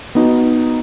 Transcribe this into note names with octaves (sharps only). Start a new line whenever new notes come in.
B3 D#4 F#4